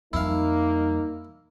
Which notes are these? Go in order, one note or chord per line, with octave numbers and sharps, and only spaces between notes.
F2 G3 A#3 D#4 E4 F5